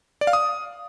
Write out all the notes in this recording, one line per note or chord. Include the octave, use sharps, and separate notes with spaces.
D5
F5
D#6